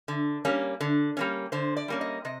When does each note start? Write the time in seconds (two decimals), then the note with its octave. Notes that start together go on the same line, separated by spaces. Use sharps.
0.08 D3
0.45 G3 A#3 C#4
0.81 D3
1.17 G3 A#3 C#4
1.52 D3 C5
1.77 D5
1.88 G3 A#3 C#4
2.01 D#5
2.25 C3 D#5